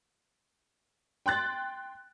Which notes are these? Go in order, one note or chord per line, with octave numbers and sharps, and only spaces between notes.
G5 C6 F#6 A6